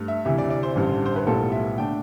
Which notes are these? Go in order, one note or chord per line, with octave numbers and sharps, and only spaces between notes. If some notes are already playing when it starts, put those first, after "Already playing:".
Already playing: G2 A3
E5
D2 C3 E3 E5
D5
D5
C5
A1 G2 D3 G3
C5
B4
B1 A2 G3 B3 F4 A4
E5
D3 A3 D4 G5